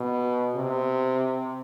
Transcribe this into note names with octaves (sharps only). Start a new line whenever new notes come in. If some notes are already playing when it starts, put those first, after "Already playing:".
Already playing: B2
C3